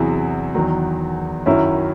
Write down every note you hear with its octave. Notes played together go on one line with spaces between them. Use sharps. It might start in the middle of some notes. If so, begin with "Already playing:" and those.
Already playing: E2 C3 F#3 E4 G#4
E2 D#3 F#3
F#2 D#3 F#3 C#4 E4